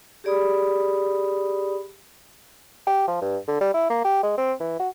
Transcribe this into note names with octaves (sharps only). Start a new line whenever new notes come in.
G4 G#4 D5 B5 D#6
G4
F3
G2
D3
G3
E4
A#3
G4
G#3
C4
E3
F#4